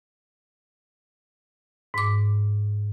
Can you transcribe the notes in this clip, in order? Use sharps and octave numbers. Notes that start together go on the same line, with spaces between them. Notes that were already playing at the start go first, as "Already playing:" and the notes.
G#2 D6